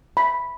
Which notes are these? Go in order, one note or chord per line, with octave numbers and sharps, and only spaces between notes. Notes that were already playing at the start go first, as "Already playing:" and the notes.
B5